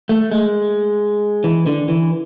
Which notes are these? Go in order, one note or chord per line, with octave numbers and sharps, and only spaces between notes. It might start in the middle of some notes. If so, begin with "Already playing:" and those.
A3
G#3
E3
D3
E3